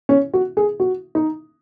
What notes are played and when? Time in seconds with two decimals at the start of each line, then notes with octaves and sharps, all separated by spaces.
0.09 C#4
0.34 F#4
0.57 G#4
0.80 F#4
1.15 D#4